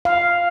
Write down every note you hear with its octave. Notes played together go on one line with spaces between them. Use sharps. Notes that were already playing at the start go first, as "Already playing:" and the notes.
F5